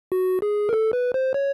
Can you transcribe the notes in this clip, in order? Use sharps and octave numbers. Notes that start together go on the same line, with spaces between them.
F#4
G#4
A#4
A4
B4
C5
C#5